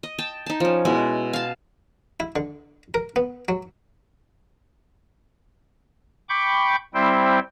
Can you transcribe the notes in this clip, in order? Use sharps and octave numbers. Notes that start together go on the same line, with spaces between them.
D#5
G5 A5
D#4 A5
F3 C#4
B2 G#3 E4
F5 A5
E4
D3
A#4
B3
F#3
G5 B5 C#6 D6 G6
G3 C4 E4 C5 G5